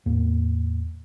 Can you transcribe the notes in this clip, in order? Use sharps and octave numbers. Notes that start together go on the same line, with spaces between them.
E2 A2 A#3